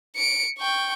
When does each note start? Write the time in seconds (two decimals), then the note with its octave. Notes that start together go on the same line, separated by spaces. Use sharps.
0.16 C#7 D7
0.58 G5 C#6